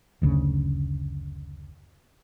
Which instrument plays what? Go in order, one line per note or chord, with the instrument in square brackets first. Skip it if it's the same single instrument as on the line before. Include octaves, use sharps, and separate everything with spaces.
[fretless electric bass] F#1 D2 C#3